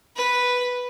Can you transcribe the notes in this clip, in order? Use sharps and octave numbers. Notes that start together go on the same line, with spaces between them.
B4